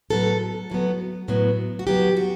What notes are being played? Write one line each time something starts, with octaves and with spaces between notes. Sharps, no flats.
A2 F#3 B3 A4
A2 F#3 B3
A2 F#3 B3
F#4
A2 F#3 B3 G4
F#4